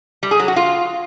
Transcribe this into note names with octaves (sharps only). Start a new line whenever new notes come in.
G3
G#4
F#3
F#4
F4